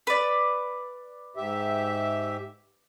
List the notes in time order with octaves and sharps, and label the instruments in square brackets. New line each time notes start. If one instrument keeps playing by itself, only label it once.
[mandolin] B4 D5
[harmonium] G#2 G4 E5